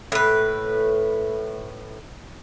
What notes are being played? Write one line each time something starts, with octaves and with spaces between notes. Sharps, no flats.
A2 B4